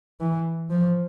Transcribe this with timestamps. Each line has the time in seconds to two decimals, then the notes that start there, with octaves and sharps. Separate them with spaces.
0.21 E3
0.70 F3